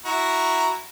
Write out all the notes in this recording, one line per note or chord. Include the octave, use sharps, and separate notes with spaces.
E4 F#4 A#5